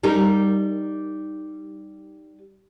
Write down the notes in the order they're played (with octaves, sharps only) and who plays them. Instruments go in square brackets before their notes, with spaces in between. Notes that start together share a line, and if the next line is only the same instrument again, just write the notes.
[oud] G3 D#4 A#4